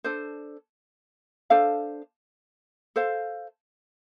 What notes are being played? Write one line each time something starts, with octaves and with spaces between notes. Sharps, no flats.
D4 A4 C5
D4 A4 C5 F5
A4 C5 F5